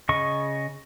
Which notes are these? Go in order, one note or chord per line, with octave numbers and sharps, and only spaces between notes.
C#3 D#5 C#6